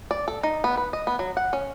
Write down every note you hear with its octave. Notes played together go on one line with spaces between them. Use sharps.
D5
A4
D#4
B3
B4
D#5
B3
F#3
F#5
C#4